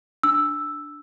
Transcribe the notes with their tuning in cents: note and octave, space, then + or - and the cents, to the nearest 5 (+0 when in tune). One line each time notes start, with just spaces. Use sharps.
D4 +0 E6 +0